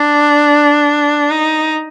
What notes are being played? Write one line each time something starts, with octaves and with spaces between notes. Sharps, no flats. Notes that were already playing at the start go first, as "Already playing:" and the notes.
Already playing: D4
D#4